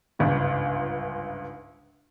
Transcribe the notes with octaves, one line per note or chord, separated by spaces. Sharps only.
G1 C#2 G#2